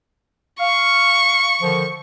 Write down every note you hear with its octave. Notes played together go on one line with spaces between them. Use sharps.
F5 C#6
D3 D#3 F3